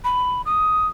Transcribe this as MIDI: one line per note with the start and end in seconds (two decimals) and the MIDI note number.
0.04 0.42 83
0.46 0.87 87